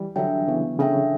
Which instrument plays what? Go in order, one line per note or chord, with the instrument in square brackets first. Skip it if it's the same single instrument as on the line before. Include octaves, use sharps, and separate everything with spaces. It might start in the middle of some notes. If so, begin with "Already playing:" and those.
Already playing: [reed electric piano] E3 G3
[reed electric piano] D3 F#3 [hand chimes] D4 A4 E5 G5
[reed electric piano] C#3 E3 [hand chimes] B3
[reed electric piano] C#3 [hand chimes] D4 A4 E5 G5